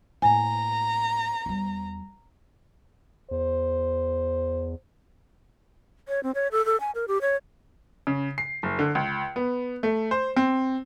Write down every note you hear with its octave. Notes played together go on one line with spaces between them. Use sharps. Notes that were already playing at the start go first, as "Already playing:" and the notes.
A2 A#3 G#5 A#5
E2 G3
E2 C5
C#5
C4
C#5
A4
A4
G#5
A#4
G4
C#5
C#3
C7
F#1
D3
C#2
B3
A3
C5
C4